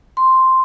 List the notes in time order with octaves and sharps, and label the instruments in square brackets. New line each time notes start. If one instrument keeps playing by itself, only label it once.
[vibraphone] C6